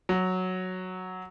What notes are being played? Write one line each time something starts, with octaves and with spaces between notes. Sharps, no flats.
F#3